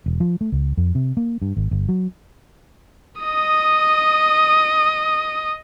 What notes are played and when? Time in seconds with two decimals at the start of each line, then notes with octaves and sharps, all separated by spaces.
0.06 E1
0.20 F3
0.41 A3
0.52 C#2
0.77 F2
0.95 C3
1.17 A#3
1.42 G2
1.57 G#1
1.71 G1
1.89 F#3
3.21 D#5 D#6